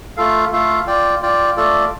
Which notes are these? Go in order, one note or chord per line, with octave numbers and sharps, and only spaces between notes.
A3 F4 A4 F5
A3 F4 A4 F5
F4 D5 G5
F4 D5 G5
A3 F4 A4 D5